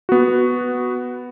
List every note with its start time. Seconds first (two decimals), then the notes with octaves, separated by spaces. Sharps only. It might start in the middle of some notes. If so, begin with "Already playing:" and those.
0.09 B3 F#4